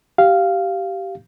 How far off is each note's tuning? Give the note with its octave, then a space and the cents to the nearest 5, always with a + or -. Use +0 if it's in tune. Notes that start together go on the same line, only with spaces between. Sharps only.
G4 -15 F5 -5